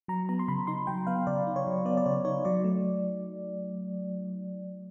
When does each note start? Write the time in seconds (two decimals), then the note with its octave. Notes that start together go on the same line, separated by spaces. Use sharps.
0.08 F#3 A#5
0.29 B3 A#5
0.39 C6
0.48 C#3 B5
0.67 D#4 C6
0.87 F#3 G5
1.07 B3 F5
1.27 C#3 D5
1.47 D#4
1.56 C#5
1.67 F#3
1.85 B3 D5
1.97 D5
2.06 C#3 C#5
2.25 D#4 C#5
2.45 F#3 D5
2.64 A3